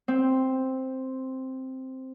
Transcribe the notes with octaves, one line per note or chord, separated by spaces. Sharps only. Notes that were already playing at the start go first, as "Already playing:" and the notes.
C4